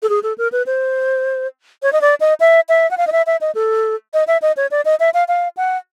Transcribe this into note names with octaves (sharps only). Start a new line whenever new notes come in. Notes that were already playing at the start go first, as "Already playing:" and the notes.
A4
G#4
A4
A#4
B4
C5
C#5
D#5
D5
D#5
E5
E5
F#5
F5
D#5
E5
E5
D#5
A4
D#5
E5
D#5
C#5
D5
D#5
E5
F5
F5
F#5